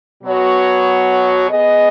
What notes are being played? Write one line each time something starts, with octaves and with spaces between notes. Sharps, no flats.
B2 F#3 B3 F#4 C#5
B3 G#4 D#5